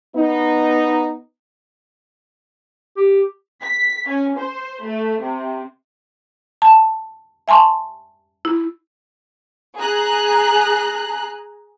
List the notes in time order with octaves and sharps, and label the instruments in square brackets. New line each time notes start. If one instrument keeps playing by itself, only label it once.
[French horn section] B3 D#4
[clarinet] G4
[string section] B6
C#4
C5
A3
C3
[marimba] A5
E5 G#5 A5 C6 C#6
E4
[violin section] G#4 A#5 F#6